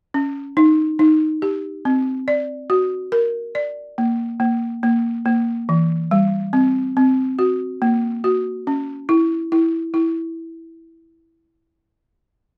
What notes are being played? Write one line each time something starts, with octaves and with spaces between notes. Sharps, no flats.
C#4
D#4
D#4
G4
C4
D5
F#4
A#4
D5
A#3
A#3
A#3
A#3
E3
G3
C4
C4
F#4
A#3
F#4
C#4
E4
E4
E4